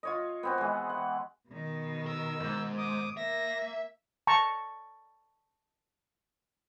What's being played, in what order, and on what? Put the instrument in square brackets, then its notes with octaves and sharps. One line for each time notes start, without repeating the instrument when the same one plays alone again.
[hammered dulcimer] F4 C#5 D#5
B3 C4 F#4
E3 G#3
F#5
[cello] B2 D#3
[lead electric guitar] A#4 [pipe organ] E6
[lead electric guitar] F2 G#2
[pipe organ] D6 D#6
[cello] A#3 [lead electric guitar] E5 [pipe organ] A#6
[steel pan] A5 A#5 C#6